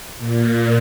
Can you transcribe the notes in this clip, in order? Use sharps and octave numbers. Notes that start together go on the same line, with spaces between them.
A#2